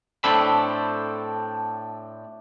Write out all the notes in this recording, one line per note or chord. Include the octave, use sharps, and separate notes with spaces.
A2 C4 D4 A4 B5